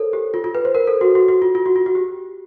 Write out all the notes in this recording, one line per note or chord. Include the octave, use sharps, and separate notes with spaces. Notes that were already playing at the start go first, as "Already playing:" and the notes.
Already playing: A4 A#4 C5 C#5
G4
F4
F4
B4
C5
A#4
A4
F#4
F#4
F#4
F4
F4
F#4
F4
F#4
G4